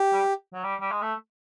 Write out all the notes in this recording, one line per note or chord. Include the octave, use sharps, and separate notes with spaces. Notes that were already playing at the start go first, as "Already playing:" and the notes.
Already playing: G4
G3
F#3
G3
G3
G#3
A3